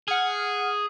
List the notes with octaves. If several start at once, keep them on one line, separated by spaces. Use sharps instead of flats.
G#4 F#5 F6